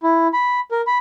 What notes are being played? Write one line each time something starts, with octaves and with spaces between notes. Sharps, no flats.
E4
B5
A#4
B5